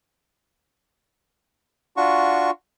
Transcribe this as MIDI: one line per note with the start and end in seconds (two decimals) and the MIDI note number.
1.97 2.51 62
1.97 2.51 65
1.97 2.51 66
1.97 2.51 85